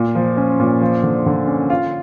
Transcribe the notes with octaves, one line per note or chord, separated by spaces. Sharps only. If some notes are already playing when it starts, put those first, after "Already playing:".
Already playing: A#2
F3
C#4
A#2
F3
D3
D3
C#4
F4